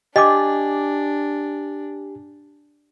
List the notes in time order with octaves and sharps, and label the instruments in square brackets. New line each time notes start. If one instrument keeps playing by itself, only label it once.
[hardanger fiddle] D4 [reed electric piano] G4 G#5 [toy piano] D#5 D6